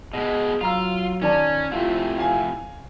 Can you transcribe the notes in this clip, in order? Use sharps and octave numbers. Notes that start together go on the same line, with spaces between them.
B2 G#3 G#4 D#5
F#3 F4 F5 A#5 E6
D#3 C#4 D5 A5
F2 C3 A3 E4 F4
F5 G#5